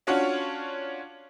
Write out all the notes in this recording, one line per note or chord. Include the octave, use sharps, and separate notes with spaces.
C#4 D4 F4 F#4 C#5